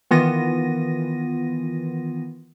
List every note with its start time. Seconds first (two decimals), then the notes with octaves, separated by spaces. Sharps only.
0.11 D#3 E3 B3 F4 A#6 D#7